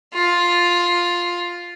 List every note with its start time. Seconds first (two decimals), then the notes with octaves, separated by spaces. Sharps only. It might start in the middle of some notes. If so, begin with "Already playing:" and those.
0.14 F4